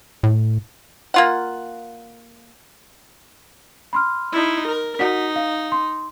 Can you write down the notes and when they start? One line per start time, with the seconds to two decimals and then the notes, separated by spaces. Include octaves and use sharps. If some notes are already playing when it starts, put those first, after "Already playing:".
0.23 A2
1.14 A#3 F4 F#5
3.93 B5 C6 F6
4.32 D#4 E4
4.67 A#4
4.99 D#4 F#4 F#5 B6
5.36 F5
5.72 C6